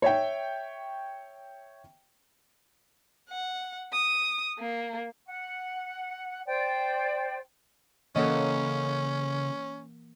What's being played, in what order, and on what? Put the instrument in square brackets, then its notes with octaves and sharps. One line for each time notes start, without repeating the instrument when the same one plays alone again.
[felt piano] C#5 E5 G5
[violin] F#5
D#6
A#3
[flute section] F#5
C5 D5 G5
[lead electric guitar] C#3 [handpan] E3 A#3 F#5 [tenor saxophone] C#4 [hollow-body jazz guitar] A4 C#5 D#5